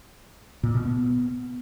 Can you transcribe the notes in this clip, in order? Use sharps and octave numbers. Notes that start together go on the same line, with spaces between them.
A#2
B2
B3